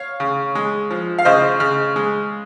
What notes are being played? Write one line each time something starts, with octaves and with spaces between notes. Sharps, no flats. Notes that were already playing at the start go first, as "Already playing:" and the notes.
Already playing: C#5 F5
C#3
G#3
F3
F5
C#3 C5 D#5
C#3
G#3